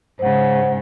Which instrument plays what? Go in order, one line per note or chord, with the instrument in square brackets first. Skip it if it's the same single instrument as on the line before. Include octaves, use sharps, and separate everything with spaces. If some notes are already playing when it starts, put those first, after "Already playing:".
[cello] G#2 C#3 [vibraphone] C5 F#5